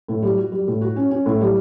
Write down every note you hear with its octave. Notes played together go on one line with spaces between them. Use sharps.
A2
G3
F#4
G3
A2
F#4
C#4
C#4
A2
G3